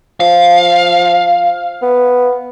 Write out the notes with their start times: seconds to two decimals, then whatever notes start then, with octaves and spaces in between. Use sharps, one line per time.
0.20 F3 F5
1.82 B3